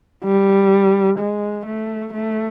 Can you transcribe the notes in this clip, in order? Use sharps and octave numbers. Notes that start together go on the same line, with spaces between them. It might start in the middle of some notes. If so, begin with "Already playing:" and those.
G3
G#3
A3
A3